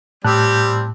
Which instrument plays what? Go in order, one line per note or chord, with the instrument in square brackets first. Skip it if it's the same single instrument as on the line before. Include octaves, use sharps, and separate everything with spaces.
[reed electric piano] A2 A5 F#6 [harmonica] G3 C4 G4